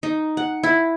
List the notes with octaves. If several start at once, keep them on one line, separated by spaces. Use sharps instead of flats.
D#4
F#5
E4